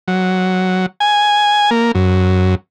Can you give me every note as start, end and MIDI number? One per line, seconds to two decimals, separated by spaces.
0.08 0.86 54
1.00 1.70 80
1.71 1.92 58
1.95 2.55 42